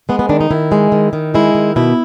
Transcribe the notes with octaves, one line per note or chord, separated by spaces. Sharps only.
G#3 B3
B3
D#3 D4
D#4
D#3 E4
G#3
D#3
D#3
G#3 E4
D#3
B2 E4